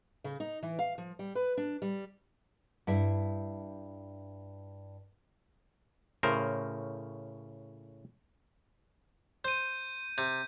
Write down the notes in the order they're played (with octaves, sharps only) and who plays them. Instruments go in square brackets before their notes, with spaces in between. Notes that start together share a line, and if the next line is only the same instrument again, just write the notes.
[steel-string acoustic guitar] C#3
D#4
E3
F5
F3
G3
B4
D4
G3
[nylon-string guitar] G2 E4 E5
[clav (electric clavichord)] A2 C#3 A#4 C5
[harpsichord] C5 [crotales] G6 D#7
[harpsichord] C3 [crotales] G6